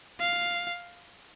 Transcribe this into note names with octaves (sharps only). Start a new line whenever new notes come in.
F5